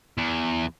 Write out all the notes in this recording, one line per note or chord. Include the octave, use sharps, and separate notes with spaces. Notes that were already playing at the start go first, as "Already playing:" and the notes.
E2